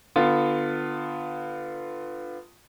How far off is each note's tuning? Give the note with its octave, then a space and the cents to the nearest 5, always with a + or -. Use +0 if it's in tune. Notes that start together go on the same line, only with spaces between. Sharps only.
D3 +30 B3 +15 F4 +0